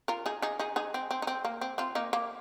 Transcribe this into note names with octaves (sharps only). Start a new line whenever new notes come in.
F4 A#4
D#4 G#4
D#4 G#4
D#4 G#4
D#4 G#4
C4
C4
D#4
C4
A#3
C4
C4 F4
A#3 D#4
A#3